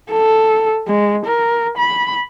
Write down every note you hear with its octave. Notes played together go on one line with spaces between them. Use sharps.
A4
G#3
A#4
B5